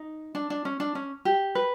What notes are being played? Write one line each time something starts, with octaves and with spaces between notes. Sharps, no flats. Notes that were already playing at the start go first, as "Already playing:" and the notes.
Already playing: D#4
D4
D4
C#4
D4
C#4
G4
B4